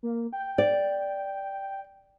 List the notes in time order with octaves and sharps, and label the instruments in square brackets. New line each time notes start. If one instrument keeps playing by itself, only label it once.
[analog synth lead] A#3
G5
[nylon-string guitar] D5